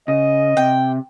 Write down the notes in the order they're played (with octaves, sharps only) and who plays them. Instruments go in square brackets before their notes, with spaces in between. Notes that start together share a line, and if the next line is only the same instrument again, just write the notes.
[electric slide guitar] C#3 [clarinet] D#5
[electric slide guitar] C3 [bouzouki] G5